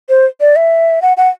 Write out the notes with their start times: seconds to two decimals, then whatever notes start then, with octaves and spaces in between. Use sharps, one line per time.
0.09 C5
0.41 D5
0.56 E5
1.02 F#5
1.17 F#5